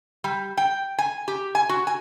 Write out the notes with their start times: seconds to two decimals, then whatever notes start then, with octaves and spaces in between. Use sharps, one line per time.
0.24 G3
0.57 G5
0.98 G#5
1.28 G4
1.55 G#5
1.69 F#4
1.87 G#5